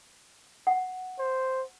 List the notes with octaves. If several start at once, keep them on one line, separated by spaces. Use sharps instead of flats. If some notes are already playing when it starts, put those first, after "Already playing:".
F#5
C5